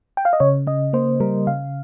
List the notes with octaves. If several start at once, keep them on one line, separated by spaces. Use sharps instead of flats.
G5
F5
D#5
C#3 C#5
C#3 D#5
A#3 C5
G3 A#4
C#3 F5